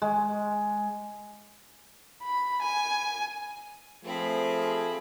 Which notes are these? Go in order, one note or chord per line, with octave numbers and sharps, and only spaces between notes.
G#3
B5
G#5
F3 A3 C4 G#4 B5